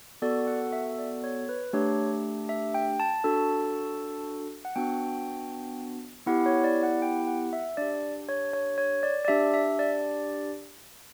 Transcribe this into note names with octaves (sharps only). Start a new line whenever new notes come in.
B3 F#4 A4 D5
F#5
E5
D5
C#5
B4
A3 D4 G4 C#5
E5
G5
A5
D4 F#4 A4
F#5
B3 D4 F#4 G5
B3 E4 G4 F#5
C#5
D5
F#5
G5
F#5
E5
D4 G4 D5
C#5
C#5
C#5
D5
D5
D4 G4 E5
E5
D5